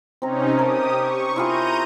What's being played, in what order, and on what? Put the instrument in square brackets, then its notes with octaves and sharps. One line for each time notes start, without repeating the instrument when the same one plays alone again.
[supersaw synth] C3 C#4 D#4 [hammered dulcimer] C4 A#5
[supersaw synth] G4 D#6 [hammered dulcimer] A#4 A5
[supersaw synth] C#6
[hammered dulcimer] E4 F4 G#4 [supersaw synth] A#5 G6 D#7